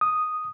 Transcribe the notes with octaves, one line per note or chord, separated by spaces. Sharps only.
D#6